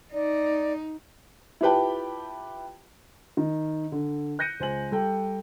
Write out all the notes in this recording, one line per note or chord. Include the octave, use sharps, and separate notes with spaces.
D#4 D5
E4 F4 G4 B4 G5 A5
D#3
D3
F#6 G6 A#6 C#7 D#7
C#2 C5 G#5 F#7
G3 A4 G5